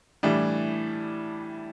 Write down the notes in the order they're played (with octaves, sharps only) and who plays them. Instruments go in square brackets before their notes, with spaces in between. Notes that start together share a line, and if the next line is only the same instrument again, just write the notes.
[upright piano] A2 E3 G3 D4